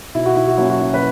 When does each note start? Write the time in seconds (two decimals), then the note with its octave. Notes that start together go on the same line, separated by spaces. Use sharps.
0.15 B2 E4
0.26 F#4
0.36 E4
0.47 F#4
0.57 F#3 A#3 C#4 E4
0.69 F#4
0.79 E4
0.94 B4